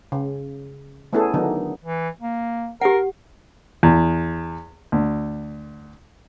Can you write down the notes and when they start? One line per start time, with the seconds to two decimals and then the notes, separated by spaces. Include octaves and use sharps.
0.12 C#3
1.13 A3 B3 C#4 E4 G#4 A4
1.34 D3 D#3 F#3 B3 D4 D#4
1.83 E3
2.21 A#3
2.81 G4 A#4 F#5
3.83 E2
4.92 D2